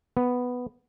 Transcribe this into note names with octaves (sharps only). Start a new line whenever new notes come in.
B3